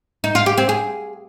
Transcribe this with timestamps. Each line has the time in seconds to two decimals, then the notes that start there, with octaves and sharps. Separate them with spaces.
0.24 D#4
0.35 F4
0.46 G4
0.58 C4
0.69 G#4